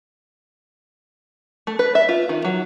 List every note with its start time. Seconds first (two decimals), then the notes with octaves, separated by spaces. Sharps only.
1.67 A3
1.79 B4
1.95 E5
2.09 F4
2.29 D#3
2.45 F#3